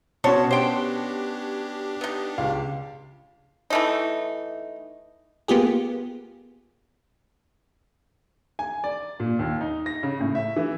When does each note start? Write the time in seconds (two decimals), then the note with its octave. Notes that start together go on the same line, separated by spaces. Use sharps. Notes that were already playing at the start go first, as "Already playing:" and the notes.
0.24 B2 B3 C#4 F#4 C5 C#5 A5
0.51 D4 G4 C5 G5
2.01 B3 D#4
2.38 C#2 F5
3.70 E3 A3 D#4
5.48 A#3 B3 F4 G4 G#4
8.59 G#5
8.84 D5
9.20 A#2
9.39 D#2
9.61 D#4
9.86 A#6
10.03 C#3
10.20 A2
10.35 E5
10.56 E3